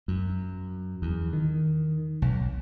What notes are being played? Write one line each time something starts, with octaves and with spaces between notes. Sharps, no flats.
F#2
E2
D#3
B1